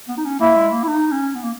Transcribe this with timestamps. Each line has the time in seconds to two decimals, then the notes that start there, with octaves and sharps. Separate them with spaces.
0.09 B3
0.17 D#4
0.25 C#4
0.40 A#3 E4
0.56 G#3
0.72 A#3
0.84 E4
0.88 D#4
1.11 C#4
1.35 B3
1.43 A#3